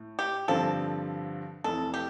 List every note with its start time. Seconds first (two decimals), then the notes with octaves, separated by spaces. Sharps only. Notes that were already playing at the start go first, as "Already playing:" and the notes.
Already playing: A2
0.19 G4
0.48 G2 D3 F3 C4 F4 A4
1.64 F1 F2 E3 A4
1.94 G4